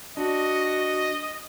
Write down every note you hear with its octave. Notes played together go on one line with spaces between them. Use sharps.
D4 F#4 D#5